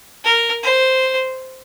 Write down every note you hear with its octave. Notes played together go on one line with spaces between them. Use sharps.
A#4
C5